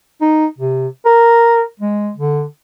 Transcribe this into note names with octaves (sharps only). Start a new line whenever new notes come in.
D#4
C3
A#4
G#3
D3